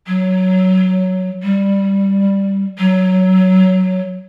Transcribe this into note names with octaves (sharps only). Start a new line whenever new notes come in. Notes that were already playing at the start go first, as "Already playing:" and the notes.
F#3
G3
F#3